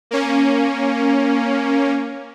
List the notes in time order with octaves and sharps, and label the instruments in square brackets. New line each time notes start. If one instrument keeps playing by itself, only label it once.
[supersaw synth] A#3 C#4